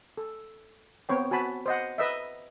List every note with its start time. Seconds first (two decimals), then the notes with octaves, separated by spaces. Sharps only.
0.18 A4
1.09 B3 C4 C#5 G5
1.31 F#4 G#5 A5 B5
1.66 C5 D#5 F#5
1.98 B4 D#5 E5